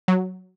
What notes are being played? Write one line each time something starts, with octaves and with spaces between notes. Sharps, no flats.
F#3